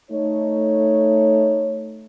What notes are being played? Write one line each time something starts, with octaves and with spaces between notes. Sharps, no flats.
A3 D#4 C#5